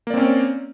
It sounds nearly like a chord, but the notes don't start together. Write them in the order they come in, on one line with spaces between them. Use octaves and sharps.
A#3 D5 C4 C#4